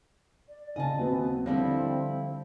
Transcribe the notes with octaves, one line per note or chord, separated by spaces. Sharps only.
D5
C#3 D#4 D#5 G#5 A5
D#2 F#3 B3 C4
D3 F3 G3 C4 E4 D5 A#6